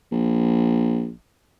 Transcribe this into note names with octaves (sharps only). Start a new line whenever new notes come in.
A#1